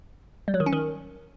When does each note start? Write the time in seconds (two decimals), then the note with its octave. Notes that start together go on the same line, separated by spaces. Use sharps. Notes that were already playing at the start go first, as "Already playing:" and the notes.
0.48 G3
0.54 F#3
0.60 D#3
0.66 C#4
0.73 D#3